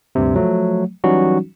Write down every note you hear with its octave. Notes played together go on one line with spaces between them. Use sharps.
D2 G2 C3
F3 F#3 A3
E3 F#3 G3 C#4 D#4 F#4